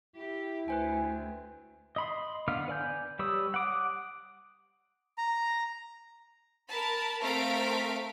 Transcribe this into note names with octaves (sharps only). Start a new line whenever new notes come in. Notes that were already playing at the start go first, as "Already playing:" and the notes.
E4 G4
D2 B4 C5 G5 G#5
D#5 B5 C6
D3 B3 F5 F6
B4 D5 G#5 G6
G3 B4 C#5 D#6 E6
F#5 D6 D#6
A#5
A#4 A5 B5
A3 C4 A#4 F5 B6 D7